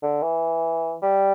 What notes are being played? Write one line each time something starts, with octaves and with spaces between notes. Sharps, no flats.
D3
E3
G3